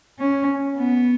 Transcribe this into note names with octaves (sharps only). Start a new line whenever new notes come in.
C#4
B3